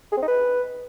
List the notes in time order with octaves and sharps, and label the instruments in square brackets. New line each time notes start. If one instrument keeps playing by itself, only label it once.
[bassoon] G#4
C4
D#4
B4